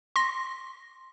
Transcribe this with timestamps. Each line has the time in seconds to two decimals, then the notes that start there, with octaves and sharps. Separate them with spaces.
0.16 C6 A#6